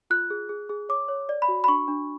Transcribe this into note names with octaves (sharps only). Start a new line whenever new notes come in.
F4 F#6
G#4
G#4
G#4
C#5 D6
C#5
D5
B5
F#4
B5
D4 C#6
D4